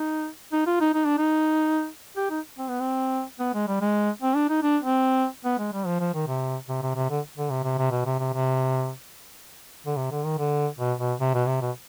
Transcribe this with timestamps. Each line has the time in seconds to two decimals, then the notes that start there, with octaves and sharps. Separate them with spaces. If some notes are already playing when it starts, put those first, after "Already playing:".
Already playing: D#4
0.53 D#4
0.67 F4
0.80 D#4
0.94 D#4
1.05 D4
1.18 D#4
2.17 G4
2.30 D#4
2.58 C4
2.69 B3
2.81 C4
3.40 B3
3.54 G#3
3.68 G3
3.81 G#3
4.22 C4
4.35 D4
4.49 D#4
4.63 D4
4.83 C4
5.45 B3
5.59 G#3
5.73 G3
5.86 F3
6.00 F3
6.14 D#3
6.28 C3
6.69 C3
6.82 C3
6.95 C3
7.10 D3
7.38 D3
7.51 C3
7.64 C3
7.78 C3
7.91 B2
8.06 C3
8.20 C3
8.33 C3
9.87 D3
9.97 C3
10.11 D3
10.24 D#3
10.38 D3
10.79 B2
11.00 B2
11.20 C3
11.34 B2
11.47 C3
11.61 B2